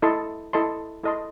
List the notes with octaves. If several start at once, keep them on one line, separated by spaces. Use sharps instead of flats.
E4 A4 D#5 A5 C6
E4 A4 D#5 A5 C6
E4 A4 D#5 A5 C6